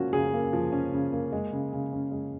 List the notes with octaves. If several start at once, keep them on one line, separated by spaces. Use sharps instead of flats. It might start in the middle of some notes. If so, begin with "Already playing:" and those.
Already playing: C#3 F3 A#3 C#4 F#4
C#3 G#4
A#3
F3
C#4
C#3
A#3
G#3
C#3
C#3
C#4
G#3